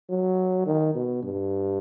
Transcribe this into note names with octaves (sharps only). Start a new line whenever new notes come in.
F#3
D#3
B2
G2